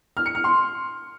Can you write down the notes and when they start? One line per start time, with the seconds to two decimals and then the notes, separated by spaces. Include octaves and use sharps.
0.17 F6
0.26 C#7
0.35 F6
0.44 C6